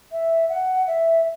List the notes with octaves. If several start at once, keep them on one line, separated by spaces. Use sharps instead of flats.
E5
F#5
E5